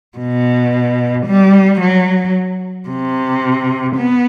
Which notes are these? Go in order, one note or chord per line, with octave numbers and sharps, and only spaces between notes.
B2
G3
F#3
C3
B3